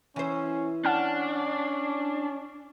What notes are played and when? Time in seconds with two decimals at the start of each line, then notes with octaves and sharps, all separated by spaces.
0.16 E3 C#4 C5
0.85 C#4 D4 F#5 A5 F6